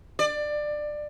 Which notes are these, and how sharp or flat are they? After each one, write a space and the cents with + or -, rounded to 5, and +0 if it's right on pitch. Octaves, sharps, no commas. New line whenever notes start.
D5 +20